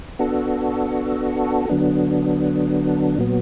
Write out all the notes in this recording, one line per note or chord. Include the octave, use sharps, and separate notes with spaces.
B3 D4 F#4 A4
D3 F#3 B3 D4
A#2 F#3 B3